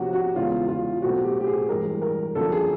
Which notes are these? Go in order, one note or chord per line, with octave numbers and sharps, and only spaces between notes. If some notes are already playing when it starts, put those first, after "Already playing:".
Already playing: C3 F3 A#3 C#4 F#4 G4
F#4
E2 C#3 E3 G#3 C#4 F4
F4
B2 F#3 A3 C4 F#4
G4
G4
G#4
G2 E3 G#3 A#4
A#4
F#2 D3 F3 A#3 A4
G#4